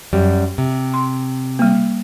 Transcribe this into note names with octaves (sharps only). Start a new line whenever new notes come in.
F#2 G3
C3
C6
G3 A#3